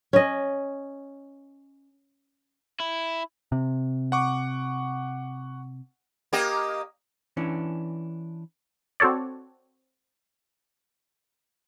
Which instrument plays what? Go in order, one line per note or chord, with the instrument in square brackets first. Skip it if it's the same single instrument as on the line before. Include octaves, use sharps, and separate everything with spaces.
[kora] C#4 D#5
[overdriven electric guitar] E4
[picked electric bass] C3
[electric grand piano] F#5 C#6 D6
[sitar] A#3 G4 D#5
[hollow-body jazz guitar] E3 C#4 D4
[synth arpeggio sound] C4 F#4 A4 C#5 D5